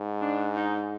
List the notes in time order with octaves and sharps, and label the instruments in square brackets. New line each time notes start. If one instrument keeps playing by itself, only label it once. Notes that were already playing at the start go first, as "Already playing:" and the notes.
Already playing: [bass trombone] G#2
[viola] D4
D#4